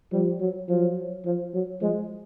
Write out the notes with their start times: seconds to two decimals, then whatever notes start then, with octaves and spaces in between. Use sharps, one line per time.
0.12 F3 G3
0.40 F#3
0.68 F3 F#3
1.25 F3
1.53 F#3
1.81 F3 G#3